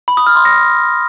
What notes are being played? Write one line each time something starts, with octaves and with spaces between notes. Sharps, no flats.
B5
D#6
F6
C6
A#6